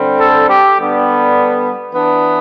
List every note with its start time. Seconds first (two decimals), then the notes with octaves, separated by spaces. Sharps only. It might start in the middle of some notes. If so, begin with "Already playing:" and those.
Already playing: D3 G3 C4
0.20 A4
0.49 G4
0.78 D3 G3 B3 D4
1.94 E3 B3 D4